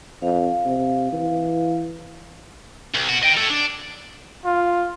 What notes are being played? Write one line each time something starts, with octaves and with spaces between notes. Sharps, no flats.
F2 F5
C3
E3
C2
B3 F#4
D#5 G5
A4 C#5
D4
F4